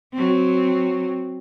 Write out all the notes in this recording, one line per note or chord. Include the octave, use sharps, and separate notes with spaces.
F#3 C4